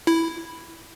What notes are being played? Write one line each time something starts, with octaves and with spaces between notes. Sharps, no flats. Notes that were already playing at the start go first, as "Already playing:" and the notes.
E4